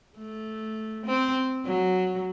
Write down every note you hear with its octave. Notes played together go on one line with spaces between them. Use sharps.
A3
C4
F#3